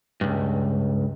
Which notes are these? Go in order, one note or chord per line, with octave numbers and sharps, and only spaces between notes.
C#2 G2